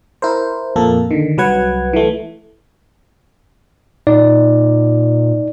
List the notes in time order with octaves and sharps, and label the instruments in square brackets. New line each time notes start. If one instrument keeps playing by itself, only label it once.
[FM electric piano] E4 A#4 C5
F2 A#2 A#3 A4
D3 D#3
C2 F#3 B4 F#5 G#6
E3 A3
[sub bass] A#2 [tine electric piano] D#4 D5